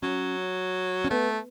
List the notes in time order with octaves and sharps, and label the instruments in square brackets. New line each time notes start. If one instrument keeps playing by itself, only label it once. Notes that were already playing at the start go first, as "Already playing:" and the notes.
[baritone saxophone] F#3 [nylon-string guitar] C#4
[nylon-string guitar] C#4
[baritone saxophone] A3 [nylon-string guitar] B3